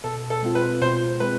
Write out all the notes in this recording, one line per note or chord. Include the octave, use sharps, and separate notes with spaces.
B2 A4
A4
G#3 C4 F4
B4
B2 C5
G#3 C4 B4